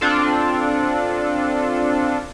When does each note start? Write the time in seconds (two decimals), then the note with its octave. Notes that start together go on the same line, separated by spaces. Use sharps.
0.01 C4 D4 F4 A4